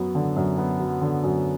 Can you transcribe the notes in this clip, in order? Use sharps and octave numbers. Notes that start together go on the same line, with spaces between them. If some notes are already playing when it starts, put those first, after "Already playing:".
Already playing: F#2 F#3 B3
D3
F#2
B3
F#3
D3
F#2